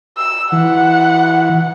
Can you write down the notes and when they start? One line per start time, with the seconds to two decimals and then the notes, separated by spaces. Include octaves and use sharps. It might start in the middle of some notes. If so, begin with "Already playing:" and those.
0.17 E6
0.52 E3 F#5